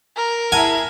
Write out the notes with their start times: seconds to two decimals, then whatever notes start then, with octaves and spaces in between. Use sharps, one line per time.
0.17 A#4
0.52 E4 G#4 E5 F#5 G#5 A5 F6